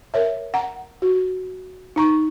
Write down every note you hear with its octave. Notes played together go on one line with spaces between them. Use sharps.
A#4 C#5 E5
F#5 A#5
F#4
D#4 A#5 C#6